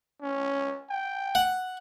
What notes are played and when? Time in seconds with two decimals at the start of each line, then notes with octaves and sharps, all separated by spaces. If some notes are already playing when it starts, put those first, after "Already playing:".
0.22 C#4
0.90 G5
1.35 F#5